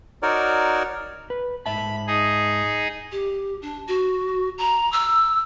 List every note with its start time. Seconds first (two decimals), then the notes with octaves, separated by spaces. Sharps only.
0.22 D#4 F#4 A#4 C#5 D5
1.30 B4
1.66 G#2 E5 A5 B5
2.07 D#4 G#4
3.12 G4
3.62 D4
3.88 F#4
4.58 A#5
4.92 E6